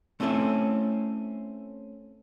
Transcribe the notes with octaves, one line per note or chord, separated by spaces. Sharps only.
A3 C4 C#4 E4 A4 E5